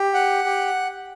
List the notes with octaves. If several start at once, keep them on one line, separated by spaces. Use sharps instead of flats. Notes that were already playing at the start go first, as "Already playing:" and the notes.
Already playing: G4
F#5
G4